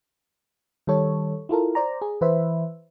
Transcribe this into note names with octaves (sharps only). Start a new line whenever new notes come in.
D#3 G3 A4 C#5
E4 F4 A4 A#4
C5 D5 A#5
G#4
E3 B4 C5 E5